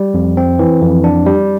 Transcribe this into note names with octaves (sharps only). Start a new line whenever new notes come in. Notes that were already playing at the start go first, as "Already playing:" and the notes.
Already playing: G3
F2
C4
E3
F2
D4
G3